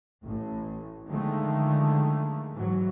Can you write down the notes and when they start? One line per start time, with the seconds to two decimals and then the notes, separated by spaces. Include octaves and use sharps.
0.25 A1 A2
1.08 D3 D#3 F3 G#3 A3
2.55 G#2 E3 F#3